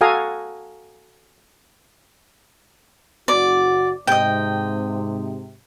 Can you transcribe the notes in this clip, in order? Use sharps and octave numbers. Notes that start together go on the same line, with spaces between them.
F#4 A4 F5 G#5 A#5 D#6
F#1 F#4 D5
G#2 C3 D#5 G5